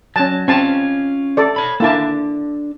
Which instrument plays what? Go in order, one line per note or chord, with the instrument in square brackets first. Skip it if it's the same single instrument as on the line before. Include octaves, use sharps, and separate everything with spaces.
[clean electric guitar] F#3 [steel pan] C#4 A5
[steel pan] C4 A5 [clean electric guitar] C#4 F4
[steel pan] A4 D5
[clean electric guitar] C#5 B5
[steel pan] A#3 E4 A5 [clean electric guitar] D4 A4